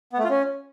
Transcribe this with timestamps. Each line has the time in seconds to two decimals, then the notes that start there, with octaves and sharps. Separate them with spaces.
0.13 B3
0.19 A3
0.24 F4
0.30 C#4